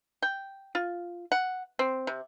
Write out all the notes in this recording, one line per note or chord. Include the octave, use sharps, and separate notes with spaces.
G5
F4
F#5
C4
C3